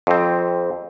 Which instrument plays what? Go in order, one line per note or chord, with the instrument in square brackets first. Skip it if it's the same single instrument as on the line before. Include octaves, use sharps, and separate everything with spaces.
[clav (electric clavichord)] F2 C4